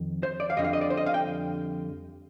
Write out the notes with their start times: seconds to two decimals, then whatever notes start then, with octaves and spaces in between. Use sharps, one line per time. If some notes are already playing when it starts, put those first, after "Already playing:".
Already playing: F2 D#3
0.23 C5
0.40 D5
0.50 F5
0.57 F2 D3 G3 D#5
0.64 F5
0.73 D#5
0.81 D5
0.90 C5
0.97 D#5
1.06 F5
1.14 G5